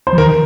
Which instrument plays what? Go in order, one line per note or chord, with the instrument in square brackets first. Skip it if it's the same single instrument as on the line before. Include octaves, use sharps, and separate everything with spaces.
[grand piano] C5
[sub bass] F3
[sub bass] D#3 [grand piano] A#4